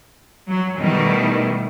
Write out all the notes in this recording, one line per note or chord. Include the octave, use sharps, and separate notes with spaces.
F#3
B2 D#3 G3 A3 E4